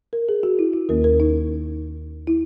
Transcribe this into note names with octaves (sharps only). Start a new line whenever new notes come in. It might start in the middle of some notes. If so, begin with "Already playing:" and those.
A#4
G#4
F#4
E4
E4
D#2 D#3 A#3 C#4 A#4
A#4
D#4
E4